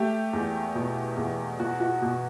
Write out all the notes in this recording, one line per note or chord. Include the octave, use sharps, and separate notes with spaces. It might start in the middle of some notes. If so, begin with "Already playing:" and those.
Already playing: A3 G4
E2
B2
E2
B2 F#4
F#4
B2